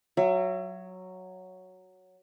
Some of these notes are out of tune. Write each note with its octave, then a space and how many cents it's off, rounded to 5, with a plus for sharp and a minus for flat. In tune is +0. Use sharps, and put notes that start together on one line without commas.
F#3 +0 E5 +35